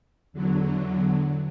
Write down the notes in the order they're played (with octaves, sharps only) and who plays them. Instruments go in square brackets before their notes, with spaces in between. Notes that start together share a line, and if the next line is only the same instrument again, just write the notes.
[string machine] E2 D3 F#3